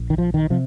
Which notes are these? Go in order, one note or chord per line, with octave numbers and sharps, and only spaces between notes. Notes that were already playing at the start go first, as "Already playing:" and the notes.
Already playing: A#1 A#2
D#3
F3
D#3
C3 F3